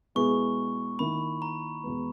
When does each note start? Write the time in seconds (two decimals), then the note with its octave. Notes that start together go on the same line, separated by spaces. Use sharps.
0.15 B2 G#3 B3 E4 G#4 C#6
0.99 D#3 A#3 E4 B5
1.42 A#5
1.83 E2 B2 G#3 B3